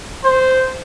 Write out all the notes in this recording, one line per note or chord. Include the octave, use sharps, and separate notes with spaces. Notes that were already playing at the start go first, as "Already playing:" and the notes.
C5